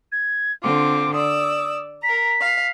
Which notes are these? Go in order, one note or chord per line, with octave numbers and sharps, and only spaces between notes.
G#6
D3 C4 F4 D6
D5 D#6 E6
A#4 A#5 B6
F5